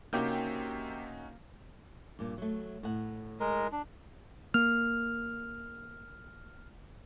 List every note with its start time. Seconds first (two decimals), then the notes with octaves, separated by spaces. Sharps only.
0.13 C3 A#3 C#4 D#4 F#4 G5 D6 G6
2.19 G2 A#2
2.38 F#3 A3
2.83 A2 F#5
3.40 G#3 A#4
3.72 D4
4.54 A#3 F6